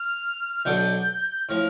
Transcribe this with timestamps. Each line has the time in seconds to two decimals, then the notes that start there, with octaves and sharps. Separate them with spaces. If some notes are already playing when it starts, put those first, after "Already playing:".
Already playing: F6
0.56 F6
0.65 B1 B2 B3 D4 A4 G6
1.49 A2 F3 F6